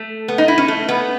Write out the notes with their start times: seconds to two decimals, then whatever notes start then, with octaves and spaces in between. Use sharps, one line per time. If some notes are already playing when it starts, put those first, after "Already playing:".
Already playing: A3
0.28 B3
0.38 D#4
0.48 E4
0.58 C#4
0.68 A3
0.89 B3